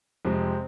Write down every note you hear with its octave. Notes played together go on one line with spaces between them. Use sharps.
F2 C3 G#3 C4